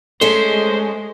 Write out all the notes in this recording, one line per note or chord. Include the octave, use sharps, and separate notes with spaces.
G#3 A3 C#4 G#4 A4 C5